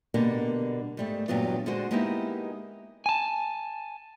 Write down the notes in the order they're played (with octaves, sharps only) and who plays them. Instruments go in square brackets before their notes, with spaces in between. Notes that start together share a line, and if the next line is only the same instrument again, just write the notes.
[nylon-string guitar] B2 D3 G3 A#3 B3
G#2 G3 A3
E2 G2 A#2 F#3 B3 F4
D3 G#3 D4 F#4 C5
G#3 A#3 B3 D#4 E4 G4
[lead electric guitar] G#5 A5